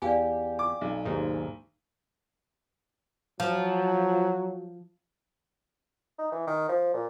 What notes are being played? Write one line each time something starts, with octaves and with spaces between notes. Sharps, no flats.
E2 G4 D5 F5 G#5
D6
B1
D#2 G#2
F3 F#3
D#4
E3
D#3
F3
A#2